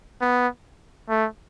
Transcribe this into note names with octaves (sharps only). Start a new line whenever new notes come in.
B3
A3